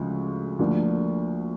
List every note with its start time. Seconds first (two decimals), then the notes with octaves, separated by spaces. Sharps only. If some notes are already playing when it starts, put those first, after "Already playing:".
Already playing: D2 C#3 F3 G#3
0.59 D2 D3 F3 A#3 D4